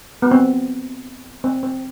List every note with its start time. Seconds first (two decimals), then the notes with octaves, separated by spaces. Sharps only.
0.22 B3
0.31 C4
1.44 C4
1.63 C4